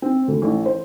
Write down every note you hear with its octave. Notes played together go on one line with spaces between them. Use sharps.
C4
D2
A1
C5